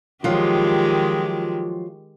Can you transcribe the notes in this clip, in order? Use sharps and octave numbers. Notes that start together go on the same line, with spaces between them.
D#3 F3 F#3 G#3 F4 G4